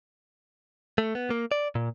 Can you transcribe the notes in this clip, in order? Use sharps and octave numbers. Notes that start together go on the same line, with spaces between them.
A3
B3
A#3
D5
A#2